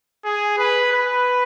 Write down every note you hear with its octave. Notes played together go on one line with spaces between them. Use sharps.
G#4
B4
B4